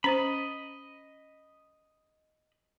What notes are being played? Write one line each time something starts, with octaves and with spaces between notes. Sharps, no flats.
C#4 C5 D#5 B5